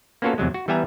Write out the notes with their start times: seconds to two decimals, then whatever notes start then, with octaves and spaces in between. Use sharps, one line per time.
0.22 A#3 B3 C#4 F4 F#4 A4
0.38 E2 C3 F#3 G#3
0.54 F#4
0.68 E3 G3 B3 E5 G#5 A#5